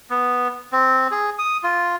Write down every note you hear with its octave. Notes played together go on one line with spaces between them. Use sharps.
B3
C4
G#4
D#6
F4